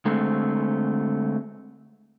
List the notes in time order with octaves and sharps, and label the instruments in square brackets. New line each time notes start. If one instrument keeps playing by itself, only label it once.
[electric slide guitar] D3 G#3 A3 C4